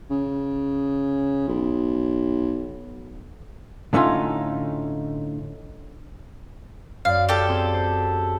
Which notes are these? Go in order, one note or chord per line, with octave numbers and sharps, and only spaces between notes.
C#3
B1
A2 D3 A3 C#4 D#4 F4
F#2 D5 F5
G4 A4
C4 G#4
C5